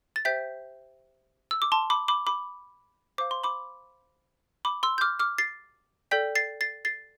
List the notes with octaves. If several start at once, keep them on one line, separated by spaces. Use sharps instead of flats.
A6
G4 C5 E5 G5 G6 B6
E6
D6
A5 C6
B5 D6
B5 D6
B5 D6
C5 F5 D6
C6
B5 D6
B5 D6
C6 E6
G6
D6 F6
D6 F6
A6 C7
A4 D5 G5 G6 B6
A6 C7
A6 C7
A6 C7